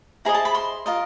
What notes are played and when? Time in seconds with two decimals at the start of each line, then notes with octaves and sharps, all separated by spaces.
0.25 E4 G#4 C5 D#5 A#5
0.35 A5
0.45 B5
0.55 C6
0.86 F4 A#4 D#5